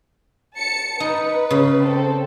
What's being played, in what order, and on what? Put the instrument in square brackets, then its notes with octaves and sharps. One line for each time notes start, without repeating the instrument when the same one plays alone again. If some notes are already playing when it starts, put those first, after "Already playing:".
[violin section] A5 C#7
[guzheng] D#4 [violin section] B4
[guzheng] C#3
[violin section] C4 A4